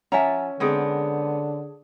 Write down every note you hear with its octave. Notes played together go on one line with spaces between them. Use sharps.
F3 C#4 E5 F#5 G#5 A#5
D3 G#3 B3 C4 G#4 D#6 G#6